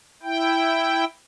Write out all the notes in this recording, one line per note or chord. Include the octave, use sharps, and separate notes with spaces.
E4 G5